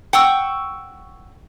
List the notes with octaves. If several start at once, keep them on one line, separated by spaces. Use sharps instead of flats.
F#5 G5 C#6 E6